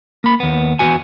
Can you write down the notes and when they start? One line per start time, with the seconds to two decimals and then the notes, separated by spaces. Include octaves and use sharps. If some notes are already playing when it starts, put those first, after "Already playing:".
0.24 A#3 B5
0.40 D#2 B3
0.79 E2 E3 B3 F#4 G#5